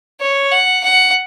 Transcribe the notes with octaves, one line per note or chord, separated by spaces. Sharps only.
C#5
F#5
F#5